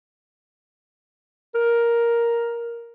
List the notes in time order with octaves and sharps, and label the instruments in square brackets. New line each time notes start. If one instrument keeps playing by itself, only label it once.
[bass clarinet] A#4